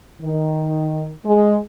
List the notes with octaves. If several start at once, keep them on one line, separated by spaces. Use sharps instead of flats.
D#3
G#3